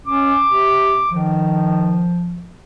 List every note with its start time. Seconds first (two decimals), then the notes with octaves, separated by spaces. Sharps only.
0.07 C#4 D6
0.45 C3
1.11 D#3 F3